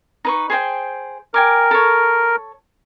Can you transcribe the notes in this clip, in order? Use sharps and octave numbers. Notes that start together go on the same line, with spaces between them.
D#4 B4 C#6
G#4 C5 G5
A#4 G5 G#5 D6
A4 C#5